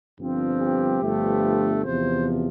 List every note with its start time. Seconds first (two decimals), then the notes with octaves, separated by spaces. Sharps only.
0.19 G1 G2 F3 C4
0.60 G4
1.01 G1 G2 F3 A3
1.83 E2 C3 F3 C5